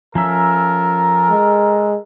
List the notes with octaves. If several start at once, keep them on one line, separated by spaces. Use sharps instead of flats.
F3 C#4 A4 A#4 E5
G#3